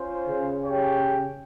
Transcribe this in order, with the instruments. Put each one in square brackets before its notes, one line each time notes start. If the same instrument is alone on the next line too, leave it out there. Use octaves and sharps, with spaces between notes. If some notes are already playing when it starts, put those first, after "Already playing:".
Already playing: [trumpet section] C#4 F4 C5
[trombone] C#3
[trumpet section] C#4 G4 C#5 G5